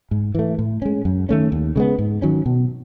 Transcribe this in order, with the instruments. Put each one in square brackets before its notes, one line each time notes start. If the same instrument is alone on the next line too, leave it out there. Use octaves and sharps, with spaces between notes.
[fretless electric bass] G#2
E3 A3
A2
G#3 C#4
F#2
D#3 A3 C#4
D#2
C#3 G#3 B3
G#2
D#3 F#3 C#4
B2